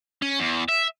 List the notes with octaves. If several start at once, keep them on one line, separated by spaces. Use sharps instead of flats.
C#4
E2
E5